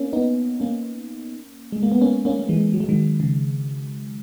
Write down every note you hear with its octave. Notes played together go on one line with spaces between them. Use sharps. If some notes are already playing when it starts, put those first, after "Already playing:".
Already playing: A#3 C#4
B3 D#4
A#3 C#4
G#3
A#3
B3
A#3 C#4
A#3 C#4
A#3
E3 G#3
F#3
G#3
D#3 F#3
C#3